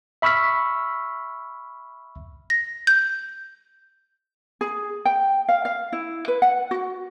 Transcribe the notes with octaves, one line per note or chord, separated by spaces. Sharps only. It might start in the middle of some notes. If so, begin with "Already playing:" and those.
E5 B5 C#6 E6 F6 B6
A#6
G6
G#4
G5
F5
F5
E4
B4
F#5
F#4